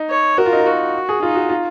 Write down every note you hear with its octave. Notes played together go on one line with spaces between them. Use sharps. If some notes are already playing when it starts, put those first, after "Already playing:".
Already playing: D#4
C#5
F#4 A#4
F4
D#4
F4
F#4
G#4
D#4 F4
F#4
F4